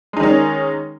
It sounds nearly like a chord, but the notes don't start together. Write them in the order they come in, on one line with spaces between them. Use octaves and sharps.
G#3 D#4 D#3 C#4